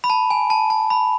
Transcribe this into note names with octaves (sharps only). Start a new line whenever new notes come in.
B5
A5
G#5
A5
A5
B5